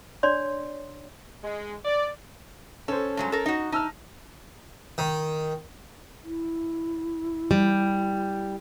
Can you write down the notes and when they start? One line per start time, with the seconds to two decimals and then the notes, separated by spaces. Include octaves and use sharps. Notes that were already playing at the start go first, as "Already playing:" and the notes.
0.23 D4 C#5 D5 C6
1.44 G#3
1.85 D5
2.88 C#4 A4 C5
3.17 G2 F#3 G#3
3.32 A4 A#4
3.46 D#4 F#4
3.72 D#4 A5 E6 F6
4.98 D#3
6.24 E4
7.51 G3